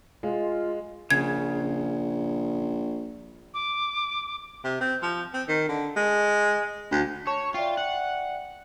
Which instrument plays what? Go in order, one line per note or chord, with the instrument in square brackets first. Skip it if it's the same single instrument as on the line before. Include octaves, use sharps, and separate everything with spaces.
[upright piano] G#3 [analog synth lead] F4
[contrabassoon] A#1 [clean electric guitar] C#3 [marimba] G#6
[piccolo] D6
[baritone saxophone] C3
C4
F3
C4
D#3
D3
G#3
D2
[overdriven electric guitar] C#5 [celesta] A5 C#6 E7
[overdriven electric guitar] F4 [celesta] D5 E5 G5
[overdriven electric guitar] F#5